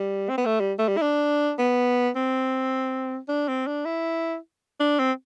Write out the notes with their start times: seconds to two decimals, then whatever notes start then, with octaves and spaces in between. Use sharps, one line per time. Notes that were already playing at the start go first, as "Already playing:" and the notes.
Already playing: G3
0.29 C4
0.38 B3
0.46 A3
0.60 G3
0.79 A3
0.88 G3
0.97 E4
1.02 D4
1.58 B3
2.16 C4
3.29 D4
3.48 C4
3.67 D4
3.85 E4
4.80 D4
4.99 C4